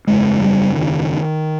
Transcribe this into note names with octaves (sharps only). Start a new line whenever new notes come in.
F#1 E2 C#3 G#3
G3
D#3